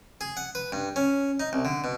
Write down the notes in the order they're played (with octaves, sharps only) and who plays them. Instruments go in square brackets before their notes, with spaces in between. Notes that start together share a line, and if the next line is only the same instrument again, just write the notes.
[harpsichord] G#4
F#5
B4
G2
C#4
D#4
C2
D3
B2